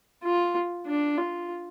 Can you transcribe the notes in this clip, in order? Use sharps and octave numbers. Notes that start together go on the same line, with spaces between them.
F4
D4
F4